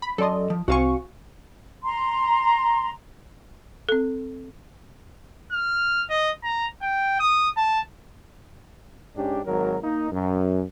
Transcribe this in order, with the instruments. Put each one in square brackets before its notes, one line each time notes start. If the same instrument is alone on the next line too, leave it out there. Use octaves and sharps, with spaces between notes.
[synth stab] B5
[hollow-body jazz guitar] F#2 C6 [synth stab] A4 D5 D#5
[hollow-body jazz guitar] F3
[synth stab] C2 C4 C#6 [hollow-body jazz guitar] F#4 F5 G#5
[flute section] A#5 C6
[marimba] C4 A4
[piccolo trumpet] F6
D#5
A#5
G5
D#6
A5
[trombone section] G#2 C#4 D4 G4
G#1 F#3 A#4
A#3 D#4
F#2